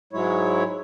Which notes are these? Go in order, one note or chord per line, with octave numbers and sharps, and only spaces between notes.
G#2 F#3 G#3 E4 C#5